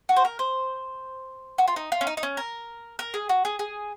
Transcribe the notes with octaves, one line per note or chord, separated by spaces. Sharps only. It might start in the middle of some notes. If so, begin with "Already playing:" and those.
F#4
C5
A#4
C5
F#4
F4
D#4
F4
C#4
D#4
D#4
C#4
A#4
A#4
G#4
F#4
G#4
G#4